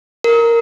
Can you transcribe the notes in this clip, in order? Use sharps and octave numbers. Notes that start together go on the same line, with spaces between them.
A#4